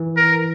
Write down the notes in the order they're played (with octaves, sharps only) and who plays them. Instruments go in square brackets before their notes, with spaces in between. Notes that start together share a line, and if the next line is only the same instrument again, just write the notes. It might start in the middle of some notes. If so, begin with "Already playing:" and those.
Already playing: [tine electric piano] E3
[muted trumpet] A#4